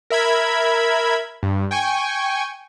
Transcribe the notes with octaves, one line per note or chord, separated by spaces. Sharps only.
A#4 E5 B5 G#6
G2
G5 G#5 C#6